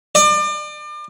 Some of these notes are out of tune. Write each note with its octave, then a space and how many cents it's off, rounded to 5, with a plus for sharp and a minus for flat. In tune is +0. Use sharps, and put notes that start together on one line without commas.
D5 +35